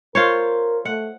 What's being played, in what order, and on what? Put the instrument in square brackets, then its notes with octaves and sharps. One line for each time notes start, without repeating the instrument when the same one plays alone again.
[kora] F4 C5 C#5 [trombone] A#4
[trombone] A3 [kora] F#5